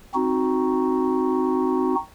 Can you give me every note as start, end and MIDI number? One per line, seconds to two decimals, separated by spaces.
0.14 1.95 60
0.14 1.95 63
0.14 1.95 66